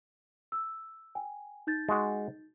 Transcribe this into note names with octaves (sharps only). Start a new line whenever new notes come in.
E6
G5 G#5
D#4 G6 A6
G#3 F#4